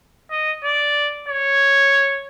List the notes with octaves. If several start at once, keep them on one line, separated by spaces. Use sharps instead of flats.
D#5
D5
C#5